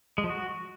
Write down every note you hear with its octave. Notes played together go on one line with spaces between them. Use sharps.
G#3
F3
F#4